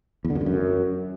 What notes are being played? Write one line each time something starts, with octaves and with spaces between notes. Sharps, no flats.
E2
D3
F#2
G2
F#2